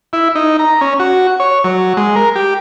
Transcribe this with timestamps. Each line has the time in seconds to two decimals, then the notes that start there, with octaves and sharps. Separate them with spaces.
0.13 E4
0.35 D#4
0.59 A#5
0.81 C#4
1.00 F#4
1.40 C#5
1.64 F#3
1.97 G#3
2.16 A#4
2.36 G4